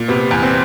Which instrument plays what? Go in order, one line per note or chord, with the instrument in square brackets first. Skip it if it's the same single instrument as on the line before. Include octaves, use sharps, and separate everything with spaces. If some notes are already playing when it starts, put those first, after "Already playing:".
Already playing: [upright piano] A#2
C3 B3
E2
C4